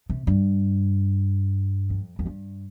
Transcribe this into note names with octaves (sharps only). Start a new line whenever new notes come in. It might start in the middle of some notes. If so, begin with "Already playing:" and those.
C3
G2
F2
F2
G2